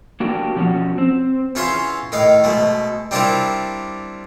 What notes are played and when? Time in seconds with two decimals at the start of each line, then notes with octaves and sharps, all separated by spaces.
0.20 A#3 D4 F#4 G4 A#4 G5
0.56 B2 F3 C#4 F#4
0.98 C4
1.55 E2 C#4 F4 E5 F5 C6
2.12 A2 D#3 D#4 F5
2.44 B2 G#3 A3
3.11 G3 C4 D4 E4 F4 A#4